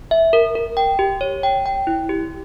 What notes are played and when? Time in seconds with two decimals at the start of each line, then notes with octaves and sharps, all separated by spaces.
0.11 E5
0.33 A#4
0.55 A#4
0.77 G5
0.99 G4
1.21 C#5
1.43 G5
1.66 G5
1.87 E4
2.09 G4